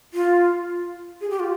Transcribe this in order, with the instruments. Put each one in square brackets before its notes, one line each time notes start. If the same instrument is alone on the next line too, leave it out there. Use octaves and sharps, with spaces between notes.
[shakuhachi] F4
G#4
G4
F4